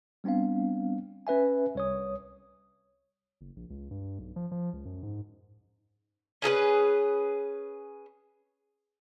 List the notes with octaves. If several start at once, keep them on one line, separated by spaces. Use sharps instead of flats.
G3 B3 C4 D4 F5
C#4 B4 E5 G#5
C2 C#5 D#6
F#1
A#1
C#2
G2
B1
F3
F3
C#2
F#2
G#2
C#4 G#4 A4 B4